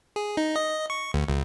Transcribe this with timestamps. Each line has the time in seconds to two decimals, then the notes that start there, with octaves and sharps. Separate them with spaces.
0.16 G#4
0.37 D#4
0.56 D#5
0.90 C#6
1.14 D2
1.28 C#2